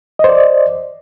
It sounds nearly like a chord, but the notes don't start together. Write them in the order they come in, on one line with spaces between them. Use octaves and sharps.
D#5 C5 D5